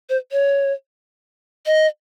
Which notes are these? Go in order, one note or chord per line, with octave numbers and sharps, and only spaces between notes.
C5
C#5
D#5